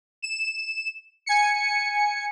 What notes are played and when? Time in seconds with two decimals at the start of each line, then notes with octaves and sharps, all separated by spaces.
0.22 E7
1.26 G#5 C#7